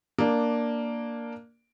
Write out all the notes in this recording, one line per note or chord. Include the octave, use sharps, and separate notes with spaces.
A#3 D4